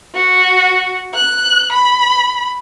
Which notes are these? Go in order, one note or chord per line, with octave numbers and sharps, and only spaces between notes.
F#4
F#6
B5